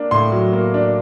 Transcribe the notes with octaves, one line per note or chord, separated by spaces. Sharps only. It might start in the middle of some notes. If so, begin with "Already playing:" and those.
Already playing: A#3 D4
A2 C6
F#3
A#3
D4